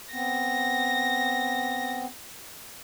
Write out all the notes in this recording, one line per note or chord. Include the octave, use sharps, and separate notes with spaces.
B3 C4 A#6